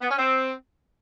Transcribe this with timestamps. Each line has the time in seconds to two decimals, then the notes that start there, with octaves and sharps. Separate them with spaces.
0.01 B3
0.10 C#4
0.19 C4